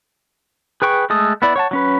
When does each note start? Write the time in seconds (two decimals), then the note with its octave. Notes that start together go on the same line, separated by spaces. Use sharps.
0.82 G#4 B4 G5 C#6
1.10 G#3 A3 A4 D#6
1.42 B3 E4 D5
1.56 C#5 F#5 A5
1.71 F#3 C#4 B4